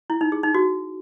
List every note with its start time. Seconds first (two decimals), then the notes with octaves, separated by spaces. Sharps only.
0.10 E4
0.21 D#4
0.32 G#4
0.43 D#4
0.54 F#4